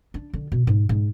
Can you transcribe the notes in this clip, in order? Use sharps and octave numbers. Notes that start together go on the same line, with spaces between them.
D4
D3
B2
G#2
G#2